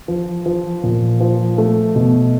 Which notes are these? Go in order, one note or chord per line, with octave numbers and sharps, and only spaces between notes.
F3
F3
A#2
F3
A3
B2